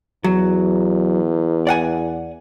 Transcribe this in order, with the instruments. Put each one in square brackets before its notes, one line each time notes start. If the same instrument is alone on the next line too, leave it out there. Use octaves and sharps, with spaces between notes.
[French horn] E2 [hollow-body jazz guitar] F#3
[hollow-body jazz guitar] D5 F#5 G#5